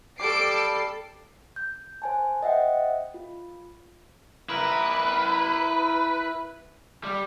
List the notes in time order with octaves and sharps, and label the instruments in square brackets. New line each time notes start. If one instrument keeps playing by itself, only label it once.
[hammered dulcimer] G3 D6 [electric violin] A4 C7 [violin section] D7
[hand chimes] G6
C5 G#5 A5
C5 D#5 E5 F#5 G5
F4
[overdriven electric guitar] E4 A#4 [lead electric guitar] B4
[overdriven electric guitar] G3